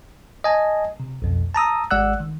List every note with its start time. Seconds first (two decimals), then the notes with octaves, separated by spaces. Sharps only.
0.44 D#5 G#5 A5
1.00 C3
1.22 B1 F2 B2
1.54 A5 A#5 D#6 E6
1.91 G#1 G#3 D5 F#5 E6 F#6
2.20 D#3